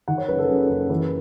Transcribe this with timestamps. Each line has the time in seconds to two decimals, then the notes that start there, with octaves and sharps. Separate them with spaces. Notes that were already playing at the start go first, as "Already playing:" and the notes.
0.08 D#3 F#5
0.18 C#5
0.28 F#1 B4
0.39 A4
0.49 F#2 G#4
0.70 F#1
0.90 E3 B4